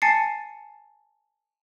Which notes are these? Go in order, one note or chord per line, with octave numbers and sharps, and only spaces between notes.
G#5 A5 A6 C7 C#7